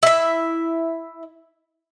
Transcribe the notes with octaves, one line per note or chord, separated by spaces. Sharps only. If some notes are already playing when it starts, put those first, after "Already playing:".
E4 E5